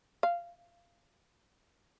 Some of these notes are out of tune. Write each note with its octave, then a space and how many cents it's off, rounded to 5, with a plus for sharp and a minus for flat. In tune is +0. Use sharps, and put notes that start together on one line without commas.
F5 -15